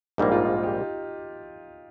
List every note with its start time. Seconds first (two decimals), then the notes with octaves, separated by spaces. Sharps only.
0.18 A#1 G#2 G3 A#3 D#4
0.32 F4
0.45 D#4
0.63 G4